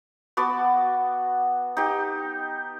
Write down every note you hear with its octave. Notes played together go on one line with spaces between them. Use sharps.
B3 F#4 A5 D6
D#4 G4